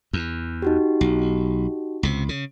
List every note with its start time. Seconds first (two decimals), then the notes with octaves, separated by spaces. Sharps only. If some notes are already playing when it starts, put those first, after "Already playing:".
0.13 E2
0.62 D#4 F#4 G4
1.01 B1
2.03 C#2 C3
2.29 C#3